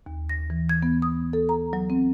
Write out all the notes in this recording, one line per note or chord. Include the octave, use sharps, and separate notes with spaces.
D#2
A#6
E3
G#6
B3
D#6
A4
A#5
F#3
C4